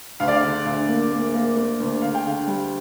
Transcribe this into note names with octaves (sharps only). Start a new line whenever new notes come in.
D2 F5
D5
F5
D3
D2 F5
A#3
A#3
A#3
A#3
D2
D3 F5
G5
D3 F5
G3